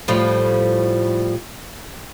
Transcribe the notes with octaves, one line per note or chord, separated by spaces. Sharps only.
A2 F3 G3